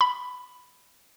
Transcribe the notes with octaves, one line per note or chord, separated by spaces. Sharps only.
B5